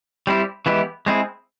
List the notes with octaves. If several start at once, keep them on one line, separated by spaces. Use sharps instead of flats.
G3 C4 E4 G4
E3 G#3 B3 E4 G4
G#3 C4 E4 G#4